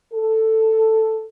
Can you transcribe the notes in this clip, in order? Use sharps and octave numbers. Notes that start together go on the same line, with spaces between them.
A4